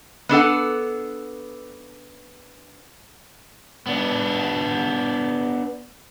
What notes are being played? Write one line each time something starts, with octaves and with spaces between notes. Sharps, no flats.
B3 D4 A4 F#5
B3 D4